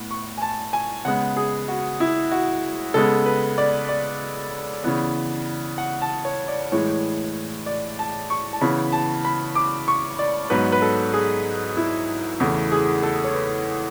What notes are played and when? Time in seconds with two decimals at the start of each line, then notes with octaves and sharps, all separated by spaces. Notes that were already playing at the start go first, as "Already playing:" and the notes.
Already playing: A2 B3
0.11 C#6
0.38 G#5
0.42 A5
0.73 G#5
1.05 C#3 G#3 B3 F#5
1.37 G#4
1.68 F#4
2.00 E4
2.31 F#4
2.94 C#3 G#3 B3 A4
3.26 B4
3.58 D5
3.89 D5
4.84 C#3 E3 B3
5.78 F#5
6.02 A5
6.25 C#5
6.48 D5
6.72 A2 E3 G#3 C#5
7.66 D5
7.99 A5
8.30 C#6
8.53 A5
8.61 C#3 E3 B3 B5
8.92 A5
9.25 B5
9.55 D6
9.88 C#6
10.19 D5
10.50 G#2 F#3 B3 B4
10.72 B4
10.82 A4
11.13 G#4
11.77 E4
12.40 E2 C#3 E3 A3
12.72 G#4
13.03 A4
13.24 C#5
13.34 B4